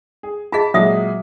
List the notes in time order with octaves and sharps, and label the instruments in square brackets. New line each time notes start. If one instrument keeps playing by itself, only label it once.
[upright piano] G#4
[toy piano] F4 G#4 D#5 [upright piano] A5 B6
[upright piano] A#2 G#3 [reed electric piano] F#3 [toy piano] E5 D#6